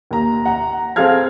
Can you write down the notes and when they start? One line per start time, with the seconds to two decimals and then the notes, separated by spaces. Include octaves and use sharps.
0.11 D#2 A#5
0.46 F#5 A#5
0.96 C4 G#4 A4 F5 F6 G#6